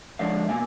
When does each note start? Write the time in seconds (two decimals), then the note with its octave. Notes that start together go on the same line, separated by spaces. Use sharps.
0.19 D3 F3 G#3 D5 F5
0.49 B2 A#3 F5 G#5